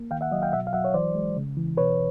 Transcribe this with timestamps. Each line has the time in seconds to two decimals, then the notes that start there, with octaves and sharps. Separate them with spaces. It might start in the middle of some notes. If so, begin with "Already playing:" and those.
Already playing: A#3
0.11 D#3 F5 G5
0.21 E5 F#5
0.31 F#3 D#5 F5
0.42 F5 G5
0.52 B2 E5 F#5
0.67 F5
0.73 F#3 E5 F#5
0.84 C#5
0.94 E3 C5 D5
1.15 G#3
1.37 C#3
1.57 E3
1.77 B2 B4 C#5